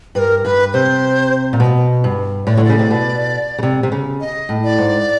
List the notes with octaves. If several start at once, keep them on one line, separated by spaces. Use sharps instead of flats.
G2 A#4 B4
G2 B4
C3 C5
A#2
B2
G2
A2 D5
D3 C#5
D5
C#3
C3
B2
C#3
C3
C3
C#3
D#5
A2
D5
G#2